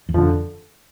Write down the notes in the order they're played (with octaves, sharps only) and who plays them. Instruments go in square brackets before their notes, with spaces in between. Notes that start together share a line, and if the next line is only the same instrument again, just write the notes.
[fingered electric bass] E2
[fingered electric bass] F2 [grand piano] D3 F3